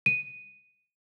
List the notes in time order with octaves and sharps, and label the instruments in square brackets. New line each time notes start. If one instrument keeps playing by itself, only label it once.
[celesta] D#7